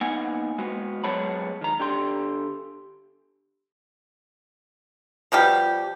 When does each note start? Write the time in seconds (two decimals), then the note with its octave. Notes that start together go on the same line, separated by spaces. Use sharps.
0.01 A#3 B3 D#4 F#5 G#5
0.58 G#3 B3 F#4
1.04 F#3 G#3 B3 C#5 A5 B5
1.61 D#3 A#5
1.80 D3 G4 C6
5.32 B2 F3 G3 G4